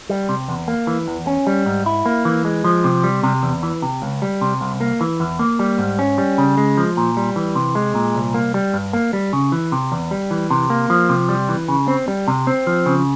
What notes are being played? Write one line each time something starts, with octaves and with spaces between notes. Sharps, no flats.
G3
C3
E2
A#3
E3
E2
C#4
G3
G#2
E4
A#3
E3
G#3
F3
C3
G3
C3
E2
E3
C3
C#2
G3
C3
C2
A#3
E3
E2
A#3
G3
G#2
C#4
G3
C#3
G#3
F3
A#2
G3
E3
C3
G#3
A#2
C2
A#3
G3
G2
A#3
G3
C#3
E3
C3
E2
G3
E3
C3
A#3
F3
C3
G3
E3
C#3
C4
G3
C3
C4
F3
C#3